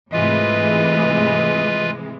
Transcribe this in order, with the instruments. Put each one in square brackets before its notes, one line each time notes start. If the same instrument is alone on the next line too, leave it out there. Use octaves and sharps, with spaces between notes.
[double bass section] G#2 A3 [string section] C3 E3 G#3 [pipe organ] F4 B4 [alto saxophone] D#5